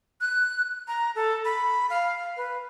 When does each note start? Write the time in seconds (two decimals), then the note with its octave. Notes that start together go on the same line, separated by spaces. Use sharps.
0.21 F#6
0.88 A#5
1.16 A4
1.45 B5
1.90 F5
2.37 B4